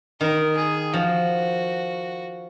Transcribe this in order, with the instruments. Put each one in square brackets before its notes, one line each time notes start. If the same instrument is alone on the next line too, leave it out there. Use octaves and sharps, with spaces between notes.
[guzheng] D#3 [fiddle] A#4
[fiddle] G#4
[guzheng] F3 [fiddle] F#4